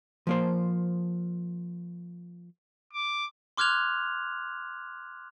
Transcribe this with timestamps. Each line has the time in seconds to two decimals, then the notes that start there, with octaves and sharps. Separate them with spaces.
0.27 F3 A#3 C5
2.93 D6
3.57 C6 D6 F6 F#6 G#6 F7